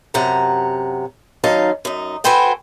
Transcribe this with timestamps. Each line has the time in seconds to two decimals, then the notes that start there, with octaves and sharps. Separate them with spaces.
0.14 F#2 C3 F#5 A5 A#5
1.44 F#2 D#3 F#3 D#4 F5 A5
1.85 F#2 D#4
2.24 F#4 A4 B4 C5 G5 G#5